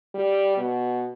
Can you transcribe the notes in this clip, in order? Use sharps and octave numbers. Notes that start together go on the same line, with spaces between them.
G3
B2